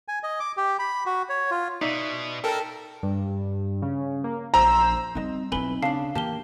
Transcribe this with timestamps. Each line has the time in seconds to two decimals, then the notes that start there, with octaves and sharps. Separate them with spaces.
0.08 G#5
0.23 D#5
0.40 D6
0.57 G4
0.79 B5
1.06 F#4
1.29 C#5
1.51 F4
1.82 B2 D#4 D5 E5 B6
2.44 A4 A#4 G5 A5
3.03 G2
3.82 C#3
4.24 A#3
4.54 A#1 C5 A#5 E6
5.15 G3 C4 D#4 D#5
5.52 B1 C4 D#4 E4 B4 G#5 F#7 G7
5.82 C#3 D4 F5 A5 C7
6.15 E3 A#3 G4 A5 G7